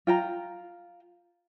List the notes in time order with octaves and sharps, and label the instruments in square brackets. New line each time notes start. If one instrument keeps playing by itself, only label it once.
[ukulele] F4 G5 A#5